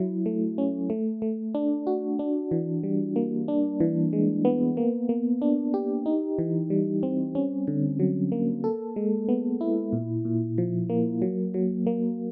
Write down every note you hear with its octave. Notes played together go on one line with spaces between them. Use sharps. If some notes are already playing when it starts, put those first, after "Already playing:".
Already playing: F#3 E4
A3
C#4
A3
A3
D4
F#4
D4
E3
G3
A#3
D4
E3
G#3
B3
A#3
A#3
D4
G4
D#4
E3
G3
C4
C#4
D3
F#3
A#3
A4
G#3
B3
E4
A#2
A#2
F3
A#3
F#3
F#3
A#3